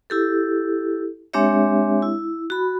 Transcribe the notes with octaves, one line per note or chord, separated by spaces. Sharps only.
E4 G4 A4
G#3 C4 D4 G4 C#5 E5
E4
F#4 B5